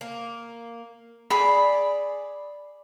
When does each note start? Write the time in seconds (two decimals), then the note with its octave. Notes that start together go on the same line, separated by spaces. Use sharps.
0.01 A#3
1.30 G#4 D5 B5